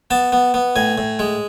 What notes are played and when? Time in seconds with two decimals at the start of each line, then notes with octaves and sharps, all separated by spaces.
0.11 B3 A5
0.32 B3
0.54 B3
0.76 A2 G#5
0.98 A2
1.19 G#3